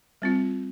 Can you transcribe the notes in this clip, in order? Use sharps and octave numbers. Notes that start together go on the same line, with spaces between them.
G3 C4 F4